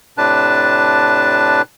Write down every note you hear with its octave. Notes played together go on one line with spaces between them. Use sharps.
A2 C3 D4 B4 A5